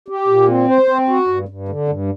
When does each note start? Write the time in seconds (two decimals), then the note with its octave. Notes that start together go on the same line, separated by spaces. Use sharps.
0.08 G4
0.28 A#2
0.48 C4
0.68 C5
0.88 C4
1.09 F#4
1.28 G2
1.48 G2
1.69 D3
1.88 G2